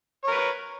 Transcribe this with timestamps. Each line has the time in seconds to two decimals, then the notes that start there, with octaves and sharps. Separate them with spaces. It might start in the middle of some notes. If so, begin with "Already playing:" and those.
0.24 C#5
0.28 A#4
0.31 B4